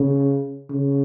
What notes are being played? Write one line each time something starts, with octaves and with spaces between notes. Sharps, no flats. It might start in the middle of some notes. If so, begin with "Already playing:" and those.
Already playing: C#3
C#3